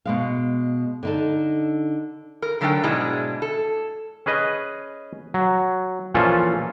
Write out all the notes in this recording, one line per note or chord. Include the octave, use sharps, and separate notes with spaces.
B2 G#3 F5
D3 D#4 A4
A#4
D3 F#3 A3 D4 A#4 G5
G#2 B2 G#3 D4 E4
A4
C#4 G#4 B4 D#5
F#3
A#2 E3 F3 C#4 F4 A4